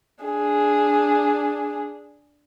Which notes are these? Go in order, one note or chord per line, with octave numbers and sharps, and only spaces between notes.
D4 G#4